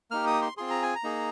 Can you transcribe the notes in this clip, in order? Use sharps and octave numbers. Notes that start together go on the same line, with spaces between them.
A#3 D#4 G4 F6
D#6
C6
C4 F4 G#4 C6
A#5
G#5
A#5
A#3 D#4 G#4